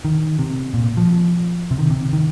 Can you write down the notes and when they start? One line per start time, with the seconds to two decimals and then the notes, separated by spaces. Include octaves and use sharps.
0.05 D#3
0.39 C3
0.74 A#2
0.97 F3
1.71 C3
1.78 D#3
1.90 C3
2.13 D#3